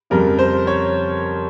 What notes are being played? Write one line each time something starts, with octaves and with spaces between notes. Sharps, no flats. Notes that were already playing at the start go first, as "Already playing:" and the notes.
F2 C#3 G3 A#4
C5
C#5